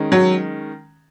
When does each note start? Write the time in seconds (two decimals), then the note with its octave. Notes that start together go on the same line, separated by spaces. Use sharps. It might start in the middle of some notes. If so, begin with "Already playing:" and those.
Already playing: D#3 G#3 C#4
0.12 F#3